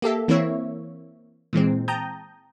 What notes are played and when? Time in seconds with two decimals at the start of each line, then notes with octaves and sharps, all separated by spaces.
0.02 A#3 G4 A4 E5
0.28 E3 A#3 C4 E4 C#5 E5
1.53 A#2 E3 G#3 C4
1.88 G5 A5 A#5 D#6 G6